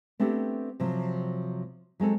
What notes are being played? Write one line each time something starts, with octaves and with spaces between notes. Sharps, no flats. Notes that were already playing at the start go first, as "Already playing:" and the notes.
A3 B3 C4 D4 G4 A4
C3 F3 F#3
F#3 G#3 C4 A4